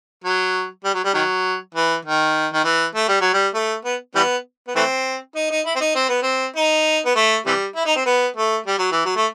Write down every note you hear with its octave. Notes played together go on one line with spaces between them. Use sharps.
F#3
G3
F#3
G3
D#3 F#3
E3
D#3
D#3
E3
A3
G3
F#3
G3
A3
B3
E3 G3 B3
B3
E3 A3 C4
D#4
D#4
E4
C4
D#4
C4
B3
C4
D#4
B3
A3
C3 E3 G3
E4
D#4
C4
B3
A3
G3
F#3
E3
F#3
A3